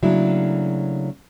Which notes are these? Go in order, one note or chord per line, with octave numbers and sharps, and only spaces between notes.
C#3 F#3 A3 A#3 D4 E4